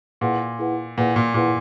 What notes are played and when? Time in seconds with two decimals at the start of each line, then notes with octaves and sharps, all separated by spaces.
0.21 A#2 E4 G#4 B4 F#5
0.59 E4 G#4 B4 F#5
0.98 A#2 E4 G#4 B4 F#5
1.16 A#2
1.34 A#2 E4 G#4 B4 F#5